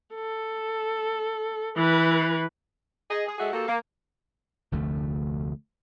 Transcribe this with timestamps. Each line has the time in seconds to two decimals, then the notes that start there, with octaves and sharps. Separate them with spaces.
0.15 A4
1.76 E3 B4
3.10 G#4 D#5
3.27 G#4
3.38 G#3 F#4 G#4 A4 E5 F#5
3.52 A#3 F#4 G4 A4
3.68 A#3
4.72 F1 D2 D3 A3